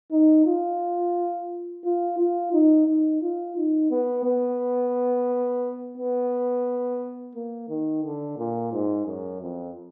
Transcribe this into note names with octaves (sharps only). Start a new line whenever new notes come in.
D#4
F4
F4
F4
D#4
D#4
F4
D#4
B3
B3
B3
A#3
D#3
D3
A#2
G#2
F#2
F2